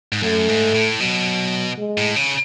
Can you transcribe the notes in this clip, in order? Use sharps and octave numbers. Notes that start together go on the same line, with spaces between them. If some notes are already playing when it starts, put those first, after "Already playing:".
G#2
F#2 A3
G#2
A2
B2 F#3
G#3
A2
C#3